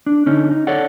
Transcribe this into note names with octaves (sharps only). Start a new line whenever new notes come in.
D4
D3 C#4 D#4
D#4
A4 C#5 D5 F#5